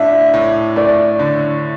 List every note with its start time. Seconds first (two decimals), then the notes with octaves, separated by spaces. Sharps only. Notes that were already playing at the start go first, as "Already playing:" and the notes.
Already playing: A2 D4 E5
0.34 A2
0.76 A3 D5
1.19 D3